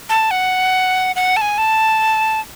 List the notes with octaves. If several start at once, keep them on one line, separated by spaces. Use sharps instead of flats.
A5
F#5
F#5
A5
G#5
A5